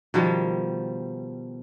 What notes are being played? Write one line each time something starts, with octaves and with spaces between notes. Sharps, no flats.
B2 D#3 F3 G3